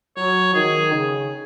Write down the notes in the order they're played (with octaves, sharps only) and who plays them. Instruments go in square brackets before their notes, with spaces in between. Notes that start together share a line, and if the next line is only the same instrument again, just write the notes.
[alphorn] F#3 [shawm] C#5
[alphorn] D#3 [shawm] G#4
[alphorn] C#3